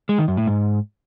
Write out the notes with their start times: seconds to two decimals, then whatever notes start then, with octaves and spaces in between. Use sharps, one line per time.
0.09 G#3
0.19 D#3
0.28 F#2
0.37 A2
0.47 G#2